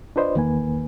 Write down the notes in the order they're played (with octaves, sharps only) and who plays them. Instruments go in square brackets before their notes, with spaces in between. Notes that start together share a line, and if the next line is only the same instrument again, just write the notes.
[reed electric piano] D4 F4 B4 C5 D5 D#5
E2 D#3 A#3 B4 G#5